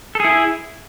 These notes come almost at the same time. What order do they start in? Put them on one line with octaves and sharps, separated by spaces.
A4 G#4 E4